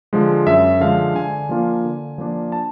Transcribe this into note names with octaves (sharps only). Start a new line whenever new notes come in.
D3 F3 G#3
F#2 E5
D3 F3 G#3 F5
D3 G#5
F3 A#3 D4 F4
D3
F3 A#3 D4 F4
A5